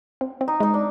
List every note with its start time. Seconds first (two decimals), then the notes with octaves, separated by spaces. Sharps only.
0.21 C4
0.41 C4
0.48 D#4
0.60 G#3 D#4
0.74 D4